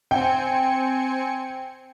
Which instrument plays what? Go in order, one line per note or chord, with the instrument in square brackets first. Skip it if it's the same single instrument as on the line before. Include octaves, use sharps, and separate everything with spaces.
[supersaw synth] C4 G#5 C#7 [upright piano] G5